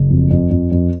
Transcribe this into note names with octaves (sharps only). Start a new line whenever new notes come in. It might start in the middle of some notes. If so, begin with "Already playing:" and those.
Already playing: F#1
F2
F2
F2
F2